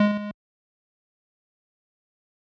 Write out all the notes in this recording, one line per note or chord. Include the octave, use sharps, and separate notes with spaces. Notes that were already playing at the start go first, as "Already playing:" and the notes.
Already playing: G#3